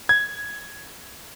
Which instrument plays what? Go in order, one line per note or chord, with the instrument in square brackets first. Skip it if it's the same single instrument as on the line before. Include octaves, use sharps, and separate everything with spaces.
[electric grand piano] G#6